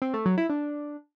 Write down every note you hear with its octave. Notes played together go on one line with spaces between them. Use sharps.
C4
A3
F#3
E4
D4